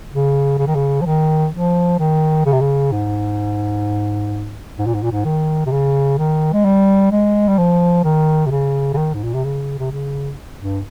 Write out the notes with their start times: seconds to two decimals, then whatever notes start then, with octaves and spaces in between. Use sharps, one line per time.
0.12 C#3
0.58 C#3
0.67 D#3
0.75 C#3
1.01 F3
1.05 D#3
1.52 F3
1.99 D#3
2.45 C#3
2.52 C3
2.60 C#3
2.92 G#2
4.78 G#2
4.86 A#2
4.94 G#2
5.03 A#2
5.11 G#2
5.24 D#3
5.66 C3
5.71 C#3
6.18 D#3
6.53 G#3
6.65 G3
7.12 G#3
7.48 G3
7.58 F3
8.04 D#3
8.46 C3
8.50 C#3
8.94 C#3
8.97 D#3
9.14 G#2
9.24 A#2
9.34 C3
9.44 C#3
9.79 C3
9.91 C#3
10.60 G2